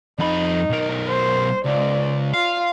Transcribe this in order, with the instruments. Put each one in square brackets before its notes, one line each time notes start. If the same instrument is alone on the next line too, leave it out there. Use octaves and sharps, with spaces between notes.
[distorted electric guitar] F2 B5 [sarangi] D#4
[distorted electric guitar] B1 A#4
[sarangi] C5
[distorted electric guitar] C#2 [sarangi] D5
[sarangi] F4 [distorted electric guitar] F5